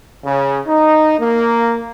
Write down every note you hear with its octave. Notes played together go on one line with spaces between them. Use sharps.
C#3
D#4
A#3